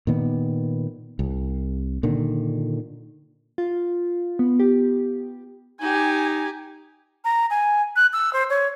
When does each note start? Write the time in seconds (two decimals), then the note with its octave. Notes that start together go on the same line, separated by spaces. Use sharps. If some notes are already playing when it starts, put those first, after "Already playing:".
0.07 A#2 D#3 B3
1.19 C2
2.03 A#2 D3 D#3
3.58 F4
4.39 B3
4.59 G4
5.82 D#4 G4 G#5
7.25 A#5
7.50 G#5
7.96 F#6
8.13 E6
8.33 C5
8.50 C#5